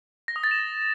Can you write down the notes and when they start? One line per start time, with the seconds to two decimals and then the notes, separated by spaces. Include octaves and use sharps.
0.28 A#6
0.36 D#6
0.44 A6
0.51 E7